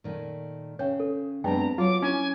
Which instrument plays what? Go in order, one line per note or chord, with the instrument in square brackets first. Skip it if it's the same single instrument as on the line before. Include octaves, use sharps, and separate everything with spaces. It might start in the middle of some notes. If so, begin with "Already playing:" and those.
[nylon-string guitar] A#2 D#3 A3
[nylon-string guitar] C#3 [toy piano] C#5 G5
[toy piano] A4
[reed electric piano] F#2 G#3 D4 [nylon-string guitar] B3 C4 [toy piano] G5 A5 [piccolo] A#5
[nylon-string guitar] F#3 C#5 [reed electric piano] F4 [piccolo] D6
[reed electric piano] C#4 [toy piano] E4 D6 [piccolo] G#5